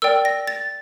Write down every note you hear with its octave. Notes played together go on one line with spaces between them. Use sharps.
A#4 D5 G5 E6
A#6
A6